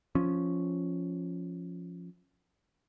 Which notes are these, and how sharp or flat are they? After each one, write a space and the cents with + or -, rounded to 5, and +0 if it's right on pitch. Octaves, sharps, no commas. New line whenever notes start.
F3 +0 C#4 +0